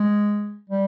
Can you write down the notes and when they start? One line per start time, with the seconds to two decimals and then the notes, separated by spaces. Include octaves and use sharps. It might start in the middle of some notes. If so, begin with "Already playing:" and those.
Already playing: G#3
0.69 G3